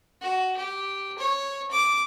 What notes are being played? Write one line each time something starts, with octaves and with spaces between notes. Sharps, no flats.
F#4
G4
C#5
D6